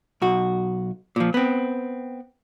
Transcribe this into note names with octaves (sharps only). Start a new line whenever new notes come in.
B1 F#4
A#2 F3
B3 C4